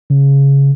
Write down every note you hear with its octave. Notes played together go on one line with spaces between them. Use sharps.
C#3